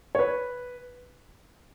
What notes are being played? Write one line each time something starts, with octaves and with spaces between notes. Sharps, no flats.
C#5
B4